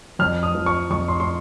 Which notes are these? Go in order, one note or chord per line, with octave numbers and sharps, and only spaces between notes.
F2 F6
D#6
F3
C#6
F2 C#6
C6
C6